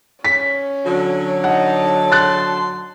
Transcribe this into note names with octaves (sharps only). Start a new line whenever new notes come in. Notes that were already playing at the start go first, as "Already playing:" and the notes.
C#4 B6
D3 F#3
D#4 F#5 A5
C6 F#6 A6